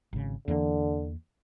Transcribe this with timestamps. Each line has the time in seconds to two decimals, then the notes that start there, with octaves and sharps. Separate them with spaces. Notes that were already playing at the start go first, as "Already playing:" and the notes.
0.13 G#1 C#3
0.48 E2 D3 E3 A#3